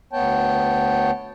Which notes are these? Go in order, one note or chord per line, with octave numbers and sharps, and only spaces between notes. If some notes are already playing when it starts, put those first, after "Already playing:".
D2 B3 C#5 G5 A5